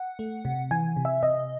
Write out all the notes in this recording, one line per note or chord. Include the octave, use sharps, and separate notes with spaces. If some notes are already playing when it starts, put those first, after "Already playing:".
Already playing: F#5
A3
C3
E3 G#5
C3
E5
C3 D#5